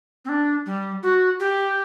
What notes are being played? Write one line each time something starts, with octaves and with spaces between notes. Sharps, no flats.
C4
D4
G3
F#4
G4